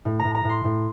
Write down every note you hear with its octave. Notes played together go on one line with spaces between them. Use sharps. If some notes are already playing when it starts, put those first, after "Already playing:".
A2
A2 A#5
A#5
A2
C6
A2